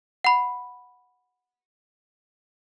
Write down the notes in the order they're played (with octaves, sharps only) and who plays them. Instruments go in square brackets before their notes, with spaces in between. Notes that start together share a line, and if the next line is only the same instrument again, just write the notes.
[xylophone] F#5 B5